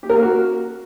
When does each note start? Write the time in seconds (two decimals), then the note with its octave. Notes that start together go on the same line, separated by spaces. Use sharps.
0.03 G4
0.09 A#4
0.16 A#3
0.23 F#4